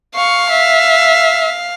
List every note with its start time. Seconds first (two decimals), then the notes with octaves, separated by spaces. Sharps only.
0.15 F5 C#6
0.50 E5